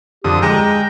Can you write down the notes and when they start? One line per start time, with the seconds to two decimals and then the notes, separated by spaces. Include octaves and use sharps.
0.24 F2 D3 G4 D#6
0.42 G#3 G5 A#5